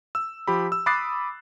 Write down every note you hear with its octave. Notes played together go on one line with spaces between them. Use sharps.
E6
F3 G4 B5
E6
B5 D6 D#6 F#6 A6 C7